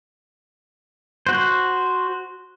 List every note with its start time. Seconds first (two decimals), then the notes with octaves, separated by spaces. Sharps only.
1.27 F#4 C5